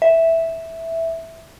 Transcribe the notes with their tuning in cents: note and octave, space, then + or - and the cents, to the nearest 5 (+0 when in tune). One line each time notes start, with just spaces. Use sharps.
E5 -5